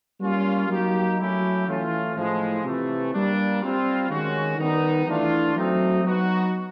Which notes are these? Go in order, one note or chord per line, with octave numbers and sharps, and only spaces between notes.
G3 A#3 C#4 F4
F#3 A#3 D#4 G4
F#3 A3 C#4 E4 G4
E3 A3 C#4 F4
A2 F3 G#3
C3 E3 A3
G3 A#3 D4
G3 C4 F4
D#3 G#3 C#4 F#4
D#3 G3 B3 D#4
E3 A3 D4 F4
F#3 A3 C4 D#4
F#3 B3 D#4 F#4